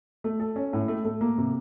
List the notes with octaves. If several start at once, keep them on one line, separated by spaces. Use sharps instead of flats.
A3
A4
C#4
A2
A3
A3
A#3
C3